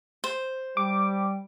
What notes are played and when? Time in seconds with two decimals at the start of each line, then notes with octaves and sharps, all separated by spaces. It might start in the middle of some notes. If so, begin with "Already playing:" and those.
0.24 C5
0.77 G3 D6